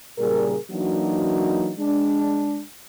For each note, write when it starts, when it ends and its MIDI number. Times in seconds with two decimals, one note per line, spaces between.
0.19 0.56 46
0.19 0.56 49
0.19 0.56 55
0.19 0.56 68
0.19 0.56 70
0.71 1.73 52
0.71 1.73 54
0.71 1.73 58
0.71 1.73 62
0.71 1.73 63
0.71 1.73 66
1.78 2.61 56
1.78 2.61 62